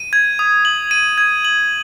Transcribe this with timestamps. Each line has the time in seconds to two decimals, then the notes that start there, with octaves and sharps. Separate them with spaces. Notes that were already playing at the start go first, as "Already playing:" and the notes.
Already playing: D#7
0.13 G#6
0.39 D#6
0.65 F#7
0.91 D#7
1.18 G#6
1.45 F#7